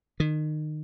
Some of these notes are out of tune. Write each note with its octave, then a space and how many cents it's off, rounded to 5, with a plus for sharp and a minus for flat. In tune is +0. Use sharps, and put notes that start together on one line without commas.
D#3 -25